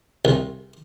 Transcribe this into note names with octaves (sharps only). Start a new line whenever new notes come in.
C2